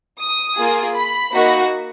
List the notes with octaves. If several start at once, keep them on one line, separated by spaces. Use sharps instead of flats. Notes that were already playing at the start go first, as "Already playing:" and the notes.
D#6
A#3 F4 G#4
B5
A#3 D#4 F#4